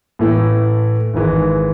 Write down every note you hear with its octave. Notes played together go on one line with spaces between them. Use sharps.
A2 E3 A3 E4
G#1 G#2 E3 G#3